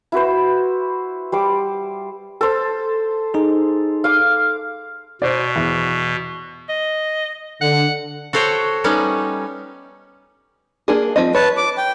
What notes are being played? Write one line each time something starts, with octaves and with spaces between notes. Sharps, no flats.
E4 F#4 B4 C5
G3 C5 D6
A4 C5
D#4 G#4
F5 D6
B2 C5 D5
E2
D#5
D3 F#5
F#4 A4 C5 C#5 G5
G3 B3 C#4 D#4
A#3 D4 G#4
F3 C4 D#5
B4 C#5 A5
D6
G5